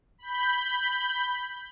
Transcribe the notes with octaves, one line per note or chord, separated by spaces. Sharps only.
B5 G6